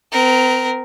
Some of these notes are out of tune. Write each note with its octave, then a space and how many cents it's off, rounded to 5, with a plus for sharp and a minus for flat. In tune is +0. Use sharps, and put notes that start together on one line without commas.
C4 -40 A#4 +0